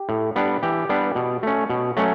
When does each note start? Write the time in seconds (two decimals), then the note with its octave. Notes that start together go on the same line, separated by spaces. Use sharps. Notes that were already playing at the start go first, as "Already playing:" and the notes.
Already playing: G4
0.09 A2
0.36 G3 B3 D4
0.63 E3 G4
0.89 G3 B3 D4
1.15 B2
1.43 A3 C#4
1.70 B2
1.97 F#3 A3 C#4